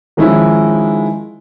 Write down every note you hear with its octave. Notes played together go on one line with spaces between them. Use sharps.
D#3 F3 G#3 C#4 D#4 E4